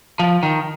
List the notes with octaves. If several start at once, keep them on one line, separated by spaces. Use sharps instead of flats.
F3
D#3